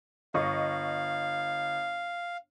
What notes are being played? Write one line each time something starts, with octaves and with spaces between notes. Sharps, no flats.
G1 D#5 F5 C#6